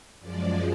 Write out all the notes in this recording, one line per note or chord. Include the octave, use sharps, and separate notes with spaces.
F#2 F3 G#3 D5